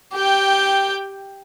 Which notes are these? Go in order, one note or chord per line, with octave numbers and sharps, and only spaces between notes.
G4 G5